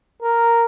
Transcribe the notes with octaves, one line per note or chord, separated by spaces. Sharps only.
A#4